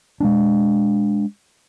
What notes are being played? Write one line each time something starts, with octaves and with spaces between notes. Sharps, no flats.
G#3 A#3 D4